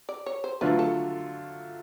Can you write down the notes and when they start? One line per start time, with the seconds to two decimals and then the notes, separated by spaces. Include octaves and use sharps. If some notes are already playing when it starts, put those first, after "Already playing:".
0.09 D5
0.26 C#5
0.44 C5
0.61 D3 F#3 A3 D4 F4 B4
0.79 A4